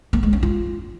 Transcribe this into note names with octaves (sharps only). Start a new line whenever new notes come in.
A#3
G#3
C#4
F4